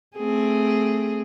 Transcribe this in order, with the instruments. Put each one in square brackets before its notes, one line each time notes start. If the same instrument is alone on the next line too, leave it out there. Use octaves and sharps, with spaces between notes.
[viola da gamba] A3 C4 G#4